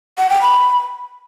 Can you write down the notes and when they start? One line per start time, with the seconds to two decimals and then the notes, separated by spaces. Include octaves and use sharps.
0.18 F#5
0.30 G5
0.42 B5